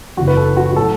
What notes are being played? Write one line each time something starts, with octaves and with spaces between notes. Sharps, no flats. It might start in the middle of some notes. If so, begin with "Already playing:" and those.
F#1 E2 C#3 E3 F#4
B4
A4
F#4
F#4
A2 F#3 A4